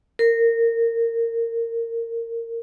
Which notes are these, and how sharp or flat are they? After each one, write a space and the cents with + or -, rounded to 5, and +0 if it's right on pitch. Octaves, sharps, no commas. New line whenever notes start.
A#4 -20